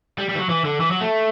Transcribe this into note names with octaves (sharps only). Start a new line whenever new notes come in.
G3
G3
E3
F#3
E3
D3
E3
F#3
A3